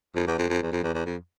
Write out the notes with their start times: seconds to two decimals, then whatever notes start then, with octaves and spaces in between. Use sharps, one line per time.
0.15 F2
0.27 E2
0.39 F2
0.49 F2
0.63 E2
0.72 F2
0.84 E2
0.94 E2
1.06 F2